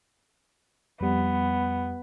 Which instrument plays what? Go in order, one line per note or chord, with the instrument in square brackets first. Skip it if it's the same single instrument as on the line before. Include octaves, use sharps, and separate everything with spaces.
[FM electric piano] F2 G3 [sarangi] B3